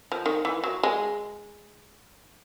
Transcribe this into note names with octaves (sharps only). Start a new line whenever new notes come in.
F3
D#3
E3
F#3
G#3